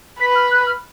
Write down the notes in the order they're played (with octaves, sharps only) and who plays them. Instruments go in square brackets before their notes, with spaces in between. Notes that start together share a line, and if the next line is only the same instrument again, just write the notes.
[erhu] B4 [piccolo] B6
[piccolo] F6
F#6
F6